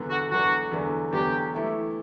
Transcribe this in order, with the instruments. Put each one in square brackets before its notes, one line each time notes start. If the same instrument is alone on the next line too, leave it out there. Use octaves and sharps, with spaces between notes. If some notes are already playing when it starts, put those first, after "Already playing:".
Already playing: [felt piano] E2 D3 F#3 B3 D4
[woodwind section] F#4
[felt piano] E2 D3 F#3 B3 D4 [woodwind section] F#4
[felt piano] E2 D3 F#3 B3 D4
[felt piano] E2 D3 F#3 B3 D4 [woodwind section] G4
[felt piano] E3 A3 E4 G4